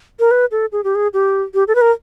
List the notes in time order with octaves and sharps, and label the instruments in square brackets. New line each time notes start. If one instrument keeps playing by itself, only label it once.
[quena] A#4
B4
A4
G#4
G4
G#4
G4
G4
A4
B4
A#4